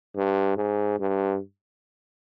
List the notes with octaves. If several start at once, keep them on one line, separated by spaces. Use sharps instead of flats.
G2
G#2
G2